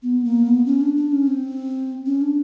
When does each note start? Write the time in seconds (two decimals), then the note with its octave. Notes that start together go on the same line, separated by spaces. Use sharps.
0.03 B3
0.25 A#3
0.45 B3
0.66 C#4
0.81 D4
0.96 D4
1.12 C#4
1.27 C4
2.06 C#4
2.21 D4